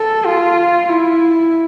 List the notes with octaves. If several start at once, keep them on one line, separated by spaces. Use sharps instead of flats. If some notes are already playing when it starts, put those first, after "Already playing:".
Already playing: A4
F4
E4